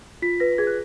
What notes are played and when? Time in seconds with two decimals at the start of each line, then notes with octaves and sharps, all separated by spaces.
0.22 F4 B6
0.40 B4 A#6
0.58 G#4 G#6
0.67 F#6